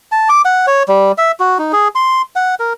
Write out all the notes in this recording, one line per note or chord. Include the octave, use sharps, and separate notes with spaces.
A5
D6
F#5
C#5
G3
E5
F#4
D#4
G#4
C6
F#5
A#4